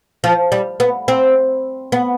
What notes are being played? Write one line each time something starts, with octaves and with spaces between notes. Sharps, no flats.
F3
G3
B3
C4
B3